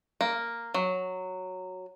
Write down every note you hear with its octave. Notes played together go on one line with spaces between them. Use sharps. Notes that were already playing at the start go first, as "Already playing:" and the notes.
A#3
F#3